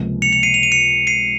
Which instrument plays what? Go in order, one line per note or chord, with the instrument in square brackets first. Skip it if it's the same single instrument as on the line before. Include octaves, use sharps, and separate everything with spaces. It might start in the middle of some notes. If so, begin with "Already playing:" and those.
Already playing: [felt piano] C#2 C3 F3 A#3
[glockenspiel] C#7 F7
C#7 F7
C7 D#7
F7
D#7
C#7 F7
C7 D#7